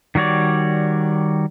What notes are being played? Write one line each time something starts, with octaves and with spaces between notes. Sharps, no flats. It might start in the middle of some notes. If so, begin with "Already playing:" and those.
D#3 G3 F#4 C#5 D5